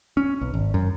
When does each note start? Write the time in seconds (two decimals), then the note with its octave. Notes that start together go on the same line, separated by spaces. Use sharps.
0.17 C#4
0.41 B1
0.54 G#1
0.74 F#2